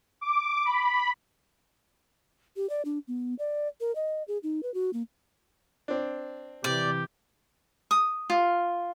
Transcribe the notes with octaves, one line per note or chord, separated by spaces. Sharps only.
D6
B5
G4
D5
D4
B3
D5
A#4
D#5
G#4
D#4
B4
F#4
A#3
C4 D4
C3 E3 G4 D5
D#6
F4